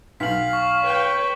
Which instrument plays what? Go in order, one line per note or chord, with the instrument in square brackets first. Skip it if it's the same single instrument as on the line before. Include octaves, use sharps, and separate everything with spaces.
[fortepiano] B1 [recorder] F5 [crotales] B6 F#7
[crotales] C#6
[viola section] B4 C#5 G5